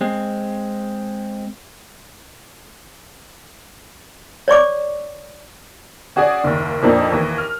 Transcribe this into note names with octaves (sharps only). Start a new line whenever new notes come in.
G#3 C4
C#5 D5 C#6 D6
C#4 F#4 G#4 D5 G#5
F#1 D#2
F2 A#2 F3 A#3 D4 D#4
D#2 E3
F6